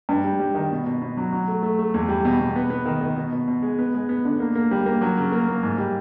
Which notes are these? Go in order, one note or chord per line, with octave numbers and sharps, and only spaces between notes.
G2
G3
G3
D#3
B2
B2
B2
F#3
F#3
A3
A3
A3
E2
G3
B2
B2
B3
B3
D#3
D#3
B2
B2
B2
G#3
B3
G#3
B3
D3
A#3
A#3
G3
A#3
F#3
C#3
A#3
A#3
G#2
G3